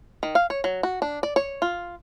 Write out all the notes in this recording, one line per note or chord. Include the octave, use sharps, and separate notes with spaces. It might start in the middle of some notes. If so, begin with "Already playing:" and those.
D#3
F5
C#5
F#3
F#4
D4
D5
C#5
F4